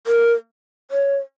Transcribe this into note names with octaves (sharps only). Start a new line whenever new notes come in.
A#4
C#5